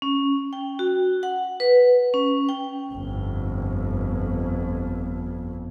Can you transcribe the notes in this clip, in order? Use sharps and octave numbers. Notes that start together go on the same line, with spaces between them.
C#4
G5
F#4
F#5
B4
C#4
G5
G1 F2